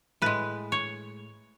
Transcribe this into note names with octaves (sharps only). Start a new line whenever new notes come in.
A2 G#3 B4
C#5